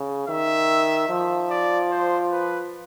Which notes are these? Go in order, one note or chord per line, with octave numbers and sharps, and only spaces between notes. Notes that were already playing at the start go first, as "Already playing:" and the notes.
Already playing: C#3
D#3 E5
F3
D5
C5
B4